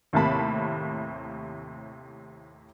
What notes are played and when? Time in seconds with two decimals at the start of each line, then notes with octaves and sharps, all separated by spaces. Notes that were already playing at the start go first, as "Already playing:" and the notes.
0.13 D#2 A2 C3 A#3 A5 B5